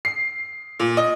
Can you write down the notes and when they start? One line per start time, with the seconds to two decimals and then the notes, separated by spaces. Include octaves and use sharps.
0.05 C7
0.80 A#2
0.97 D#5